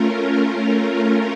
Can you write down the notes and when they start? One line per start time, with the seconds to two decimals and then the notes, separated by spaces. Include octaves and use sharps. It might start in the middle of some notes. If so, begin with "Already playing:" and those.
Already playing: A3 C#4 F4 A#4